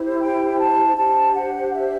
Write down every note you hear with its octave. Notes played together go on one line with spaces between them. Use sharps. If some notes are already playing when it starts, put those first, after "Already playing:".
Already playing: E4 G4 C5
G5
A5
D4 G4 C5 A5
F#5
E5